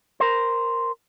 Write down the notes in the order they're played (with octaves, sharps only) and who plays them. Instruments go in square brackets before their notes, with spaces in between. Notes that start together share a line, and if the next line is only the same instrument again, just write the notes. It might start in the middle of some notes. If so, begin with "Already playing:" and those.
[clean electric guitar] A#4 C5